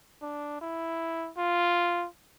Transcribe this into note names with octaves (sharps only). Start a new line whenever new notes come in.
D4
E4
F4